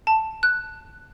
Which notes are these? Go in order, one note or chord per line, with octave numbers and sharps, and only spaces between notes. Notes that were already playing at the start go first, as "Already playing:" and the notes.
A5
F#6